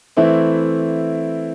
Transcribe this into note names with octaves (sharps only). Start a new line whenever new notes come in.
E3 A3 C4 E4